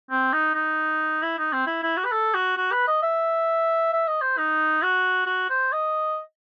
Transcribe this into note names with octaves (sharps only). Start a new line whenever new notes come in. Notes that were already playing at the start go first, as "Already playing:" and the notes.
C4
D#4
D#4
E4
D#4
C4
E4
E4
F#4
B4
A4
F#4
F#4
B4
D#5
E5
E5
D#5
C5
D#4
F#4
F#4
C5
D#5